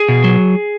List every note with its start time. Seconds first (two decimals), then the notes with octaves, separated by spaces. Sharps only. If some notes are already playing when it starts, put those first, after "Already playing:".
Already playing: G#4
0.09 B2
0.24 F#3